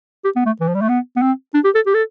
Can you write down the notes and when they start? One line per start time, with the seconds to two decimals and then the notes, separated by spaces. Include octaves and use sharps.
0.24 G4
0.36 B3
0.46 A3
0.60 E3
0.68 F3
0.74 G3
0.81 A3
0.89 B3
1.16 B3
1.22 C4
1.54 D4
1.64 G4
1.75 A4
1.86 G4
1.94 A4